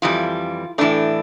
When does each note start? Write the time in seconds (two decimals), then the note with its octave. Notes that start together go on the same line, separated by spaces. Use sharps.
0.02 F2 E3 G3 F4
0.78 A2 E3 A3 D4